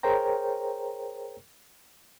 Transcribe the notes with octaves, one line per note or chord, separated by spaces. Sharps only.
G#4 A#4 C5 C#5 G5 A#5